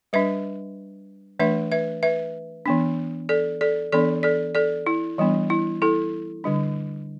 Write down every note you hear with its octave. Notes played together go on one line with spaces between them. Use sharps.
G3 D4 B4 E5
E3 A3 D4 B4 E5
B4 E5
B4 E5
E3 B3 D4
A4 D5
A4 D5
E3 B3 D4 A4 D5
A4 D5
A4 D5
E4
E3 G3 B3 D4
E4
E4 A4
D3 G3 D4